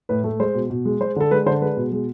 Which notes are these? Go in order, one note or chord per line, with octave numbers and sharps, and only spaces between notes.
A2 B4
A3
G#3 C5
B2
B2
G#3
G#3 C5
D3 A4
G#3 B4
D3 C5
G#3 B4
B2
G#3